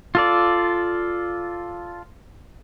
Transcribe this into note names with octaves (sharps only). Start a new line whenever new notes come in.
F4 A4 D5